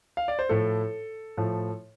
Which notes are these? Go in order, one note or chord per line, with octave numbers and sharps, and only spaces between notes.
F5
D5
C5
A2 F3 A3 A4
A2 F3 A3